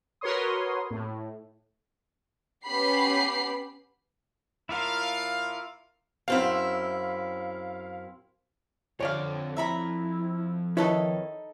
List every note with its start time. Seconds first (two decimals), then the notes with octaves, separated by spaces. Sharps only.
0.21 F#4 A#4 B4 C#5 C6 D#6
0.91 A2
2.65 B3 C#4 G4 B5 C7
4.69 A2 E4 F4 A#4 D5 F5
6.28 F#2 C4 E4 F5
9.01 F2 D3 C#5 D5 F5
9.57 E4 E5 A#5 B5
10.77 D#3 D#4 E4 A4 B4 C#5 B5